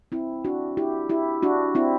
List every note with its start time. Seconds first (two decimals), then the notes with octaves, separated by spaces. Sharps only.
0.12 C4 E4
0.45 D4 F#4
0.77 E4 G4
1.09 E4 G4
1.42 D4 F#4
1.75 C4 E4